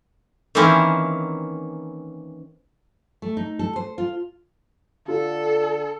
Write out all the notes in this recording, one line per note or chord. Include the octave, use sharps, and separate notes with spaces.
D#3 E3 A#3 C4 C#4 E4
A3
D#4
A4
C5
F4
D3 F4 A4